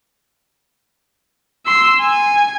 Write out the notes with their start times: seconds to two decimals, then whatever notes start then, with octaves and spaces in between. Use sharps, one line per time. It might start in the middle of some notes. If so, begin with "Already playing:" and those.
1.66 C6 E6
2.01 G#5